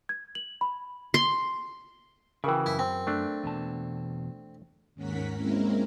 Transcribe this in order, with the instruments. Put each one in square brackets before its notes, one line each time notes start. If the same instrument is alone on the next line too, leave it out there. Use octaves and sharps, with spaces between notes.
[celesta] G#6
F#7
B5
[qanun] C6
[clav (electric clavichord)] C#3 E3 [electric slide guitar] E4 F#4 [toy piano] G#4 A#4 G5
[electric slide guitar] F#2 [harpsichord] E4
[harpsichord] C4
[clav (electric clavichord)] A3 D4
[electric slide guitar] E2 B2 A5
[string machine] D#2 G#2 C#4 A#4 F#5 B6
G#3 A#3 C4 C#4 E4 A#4